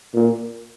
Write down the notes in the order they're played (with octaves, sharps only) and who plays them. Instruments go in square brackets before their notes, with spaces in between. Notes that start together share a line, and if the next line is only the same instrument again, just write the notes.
[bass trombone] A#2